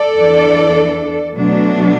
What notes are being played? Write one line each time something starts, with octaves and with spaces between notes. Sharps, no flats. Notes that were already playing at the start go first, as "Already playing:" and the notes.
Already playing: A4 D5
E2 E3 D4
B2 F#3 A3 D4